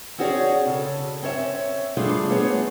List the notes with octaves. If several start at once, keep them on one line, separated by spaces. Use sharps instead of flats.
C4 C#4 F#4 G#4 C#5 D5
C#3 A4
C4 C#4 C#5 E5
G3 A3 D4 F4 G#4 A4
A3 B3 C#4 G#4 C#5